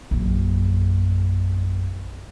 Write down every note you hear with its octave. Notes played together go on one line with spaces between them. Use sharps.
A#1 F#2